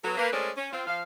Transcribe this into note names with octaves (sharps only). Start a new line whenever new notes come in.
F#3 B3 A4
A#3 B4
G#3 A3 C#4 A#4 C5 D5
C#4
C4 F4
F3 F5